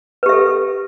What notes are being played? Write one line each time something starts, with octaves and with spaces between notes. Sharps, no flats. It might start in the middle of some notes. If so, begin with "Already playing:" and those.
G4 A4 B4 E5